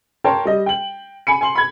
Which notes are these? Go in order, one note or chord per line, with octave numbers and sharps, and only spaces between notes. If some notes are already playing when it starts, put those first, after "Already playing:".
A#4 C#5 G5 A5 C6
G3 D#5
G5 F#7
G#5 B5 C#7
G#5 C6 F#7
B5 G#6